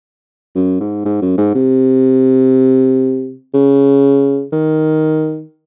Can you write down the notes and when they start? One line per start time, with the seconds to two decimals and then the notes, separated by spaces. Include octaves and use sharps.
0.56 F#2
0.80 G#2
1.05 G#2
1.22 F#2
1.38 G#2
1.55 C3
3.54 C#3
4.53 D#3